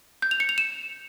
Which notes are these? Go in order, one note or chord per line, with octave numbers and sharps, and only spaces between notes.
G6
F7
C#7
F7
E7